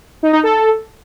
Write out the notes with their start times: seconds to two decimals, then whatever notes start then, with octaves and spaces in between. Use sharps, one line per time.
0.23 D#4
0.33 D#4
0.43 A4